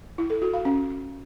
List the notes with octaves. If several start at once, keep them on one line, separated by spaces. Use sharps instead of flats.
E4
A4
F#4
F5
C#4